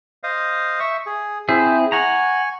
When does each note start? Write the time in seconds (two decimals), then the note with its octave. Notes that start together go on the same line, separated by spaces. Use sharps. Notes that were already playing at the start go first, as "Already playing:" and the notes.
0.23 C5 D#5 F5
0.80 E5 C#6
1.06 G#4
1.49 C4 E4 G#4 C5
1.92 F#5 G#5 A#5 C#6